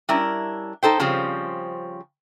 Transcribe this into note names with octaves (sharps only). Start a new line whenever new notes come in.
G3 C#4 D4 E4 A#4
D#4 A4 C5 G5
C#3 F3 G3 C4 C#4